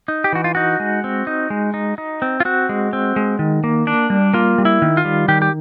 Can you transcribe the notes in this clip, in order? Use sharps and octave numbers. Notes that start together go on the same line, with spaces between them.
D#4
G4
E3 F#4
F4
D#4 F#4
G#3
C4
D#4
G#3
D#4
D#4
C4
F4
C4 F#4
G#3
C4
G#3
D#3
A#3
D4
G3
A#3 F4
G3
E4
D#3
F4
G3
D#3 G4
G4